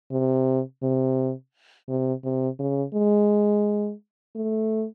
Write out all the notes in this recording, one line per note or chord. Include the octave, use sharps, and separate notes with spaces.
C3
C3
C3
C3
C#3
G#3
A3